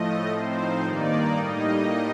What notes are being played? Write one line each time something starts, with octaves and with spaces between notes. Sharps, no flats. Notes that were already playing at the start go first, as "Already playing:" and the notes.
Already playing: A2 F3 A3 D#5
A2 F3 C4 D#4 C5
G2 D#3 A#3 D#4 D5
A2 G3 A#3 D#4 D#5